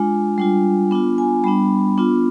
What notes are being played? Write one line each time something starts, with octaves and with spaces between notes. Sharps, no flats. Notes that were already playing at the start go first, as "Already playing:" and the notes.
Already playing: G#3 D4 F4 G#5
G3 D4 F4
B3 D4 F4
G#5
G3 B3 D4 B5
B3 D4 F4